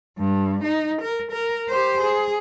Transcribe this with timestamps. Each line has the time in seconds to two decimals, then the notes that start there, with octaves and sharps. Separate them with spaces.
0.18 G2
0.64 D#4
1.02 A#4
1.31 A#4
1.69 G4 C5
2.01 G#4